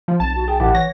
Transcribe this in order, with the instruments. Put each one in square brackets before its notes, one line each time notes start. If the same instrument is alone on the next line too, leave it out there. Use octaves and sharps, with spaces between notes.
[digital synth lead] F3
[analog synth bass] B1 [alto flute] C4 [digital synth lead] A5
[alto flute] F#4
[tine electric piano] G#4 [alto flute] G5
[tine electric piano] A1 E4 G4 [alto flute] F#5
[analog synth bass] E3 [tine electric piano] C#5 [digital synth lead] A#6